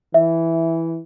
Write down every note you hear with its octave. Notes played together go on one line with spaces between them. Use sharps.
E3 E5